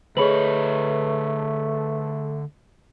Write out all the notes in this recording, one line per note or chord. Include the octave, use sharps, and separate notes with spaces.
D3 A3 G#4 B4 C#5 D#5 B5 F#7